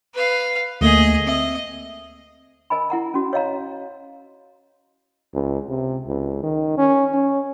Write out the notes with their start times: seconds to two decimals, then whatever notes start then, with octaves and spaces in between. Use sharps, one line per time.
0.14 B4 F5
0.81 D2 A3 A#3 G#4 D#5
1.27 C4 D#5 E5
2.70 A#4 D#5 G#5 B5
2.90 E4 F#5 A#5
3.14 C#4 F#4
3.33 C#5 D#5 F5 A#5
5.34 C#2
5.68 C3
6.08 C#2
6.43 D#3
6.78 C#4
7.13 C#4